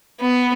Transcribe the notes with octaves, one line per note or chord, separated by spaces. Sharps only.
B3